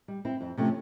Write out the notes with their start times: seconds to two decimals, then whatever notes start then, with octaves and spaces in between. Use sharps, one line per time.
0.08 G3
0.25 C4 E4
0.41 F2
0.58 C3 F3 A3 C#4